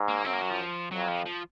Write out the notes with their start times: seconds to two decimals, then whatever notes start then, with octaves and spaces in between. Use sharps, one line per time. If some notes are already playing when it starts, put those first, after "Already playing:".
Already playing: G#2
0.08 A#3
0.25 F#2 C4
0.33 A#3
0.41 F#3
0.50 F3
0.92 F2 F#3
1.09 F3
1.26 F3